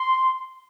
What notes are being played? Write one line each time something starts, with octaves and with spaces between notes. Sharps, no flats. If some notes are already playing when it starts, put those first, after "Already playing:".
Already playing: C6